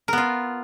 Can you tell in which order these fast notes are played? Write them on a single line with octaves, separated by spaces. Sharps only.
A#4 B3 F4